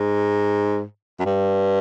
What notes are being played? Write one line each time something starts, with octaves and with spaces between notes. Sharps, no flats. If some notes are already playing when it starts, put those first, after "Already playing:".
Already playing: G#2
F#2
G2